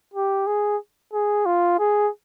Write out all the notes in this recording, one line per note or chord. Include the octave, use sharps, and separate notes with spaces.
G4
G#4
G#4
F4
G#4